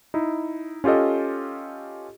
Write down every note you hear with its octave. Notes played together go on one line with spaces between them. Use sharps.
D#4 E4
C#4 F4 G4 A4 D#5